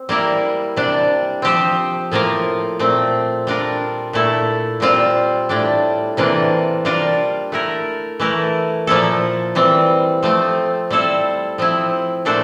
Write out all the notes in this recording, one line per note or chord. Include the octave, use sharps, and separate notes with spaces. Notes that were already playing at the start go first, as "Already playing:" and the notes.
Already playing: C4
G3 A#3 E4 A#4
C3 G3 D4
F3 C4 G4 C5
A2 F3 A#3 F4 A#4
A#2 A3 C4
G3 D4 F4 A#4
A#2 A3 E4 A4
A#2 G3 C4 F4
A2 G3 D4
C3 E3 A#3 D4 F4
G3 D4 F4 A#4
A3 E4 A#4
E3 A3 E4 A#4
A#2 F3 A#3 E4 A4
E3 G3 C4
F3 A3 C4
G3 C4 E4 A4 C5
F3 C4 E4
A#2 A3 D4 A4 C5